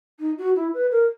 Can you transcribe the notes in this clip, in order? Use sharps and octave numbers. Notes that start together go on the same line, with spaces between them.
D#4
F#4
E4
B4
A#4